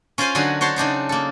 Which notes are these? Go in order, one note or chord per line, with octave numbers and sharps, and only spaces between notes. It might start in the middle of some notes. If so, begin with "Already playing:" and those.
C#4 F4 A#4 C5 F5 G#5
D3 F#3 D#4 F#4 G#5
F#4 C5 C#5 A5 C6
C#3 D4 D#4 C5
A#3 A4